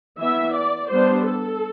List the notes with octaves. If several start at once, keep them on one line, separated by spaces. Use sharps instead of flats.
E3 B3 E4 E5
D5
G3 B3 D4 C5
A4